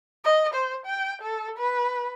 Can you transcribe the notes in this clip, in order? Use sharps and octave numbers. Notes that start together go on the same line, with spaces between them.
D#5
C5
G5
A4
B4